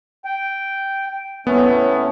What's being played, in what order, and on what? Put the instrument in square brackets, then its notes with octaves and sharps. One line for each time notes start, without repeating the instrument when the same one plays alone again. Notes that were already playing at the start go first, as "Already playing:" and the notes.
[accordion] G5
[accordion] A2 A3 C#4 [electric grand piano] B3